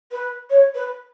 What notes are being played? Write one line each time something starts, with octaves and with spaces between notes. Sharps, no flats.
B4
C#5
B4